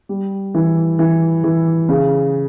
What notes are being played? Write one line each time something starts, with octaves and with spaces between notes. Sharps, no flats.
G3
E3
E3
E3
C#3